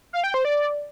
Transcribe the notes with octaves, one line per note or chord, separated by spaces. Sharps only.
F5
G5
C5
D5